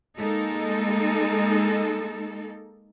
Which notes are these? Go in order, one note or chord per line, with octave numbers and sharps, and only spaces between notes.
G#3 A#3 D#4 A4